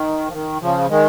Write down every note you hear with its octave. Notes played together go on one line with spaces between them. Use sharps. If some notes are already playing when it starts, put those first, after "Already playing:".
Already playing: D#3
F3
D#3
C#3 F3
D#3 G#3